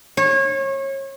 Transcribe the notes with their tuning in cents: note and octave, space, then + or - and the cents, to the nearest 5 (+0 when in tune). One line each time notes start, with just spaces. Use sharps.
C#5 -30